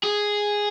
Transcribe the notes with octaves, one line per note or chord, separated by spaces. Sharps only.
G#4